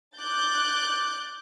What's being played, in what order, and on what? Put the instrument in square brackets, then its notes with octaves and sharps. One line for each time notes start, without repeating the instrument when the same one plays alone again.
[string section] D6 F#6 G6 A6